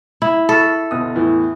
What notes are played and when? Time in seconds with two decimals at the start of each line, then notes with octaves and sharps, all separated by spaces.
0.22 E4
0.49 A4 B5 C#6 F6
0.91 G1 B2 D#6
1.15 E2 A2 E3